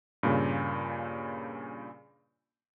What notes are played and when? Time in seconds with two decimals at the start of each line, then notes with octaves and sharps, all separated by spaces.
0.23 G2 A#2 C#3